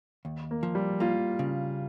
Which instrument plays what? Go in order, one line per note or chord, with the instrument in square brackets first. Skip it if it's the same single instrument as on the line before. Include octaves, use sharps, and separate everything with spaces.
[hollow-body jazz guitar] D#2
[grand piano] A#3
[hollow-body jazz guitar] F3
[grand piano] G3
[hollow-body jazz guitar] A#3 [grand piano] F4
[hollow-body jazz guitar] C#3